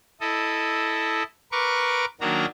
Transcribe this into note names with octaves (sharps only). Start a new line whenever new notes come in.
E4 A4 D#5
A#4 B4 C#6 D6
D#3 F#3 A#3 D4 F#4 A#5